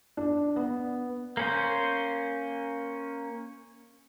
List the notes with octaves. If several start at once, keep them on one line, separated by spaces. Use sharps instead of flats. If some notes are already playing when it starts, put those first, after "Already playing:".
D4
B3
A#3 C#4 C5